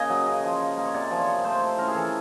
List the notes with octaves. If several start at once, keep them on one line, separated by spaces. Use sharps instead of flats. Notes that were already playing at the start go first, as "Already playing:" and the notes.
Already playing: C#3 A#3 D#5 G#5
F#3
C#3
F3
D#4
A#3
C#5
C3 D5
F3
C#5
D#4
A3 C5
E4
C#4 A#4
G#4
E3 A4